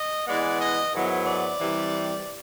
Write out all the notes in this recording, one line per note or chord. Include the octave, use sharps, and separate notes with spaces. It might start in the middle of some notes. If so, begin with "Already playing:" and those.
Already playing: D#5
E3 G#3 B3 D5
D#5
G#2 D#3 F#3 B3 E4
D5
C3 E3 G3